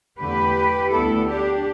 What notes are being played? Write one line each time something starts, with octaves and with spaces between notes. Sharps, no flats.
E2 D3 A3 G4 B4
D2 D3 G3 B3 E4 A4
D4 G4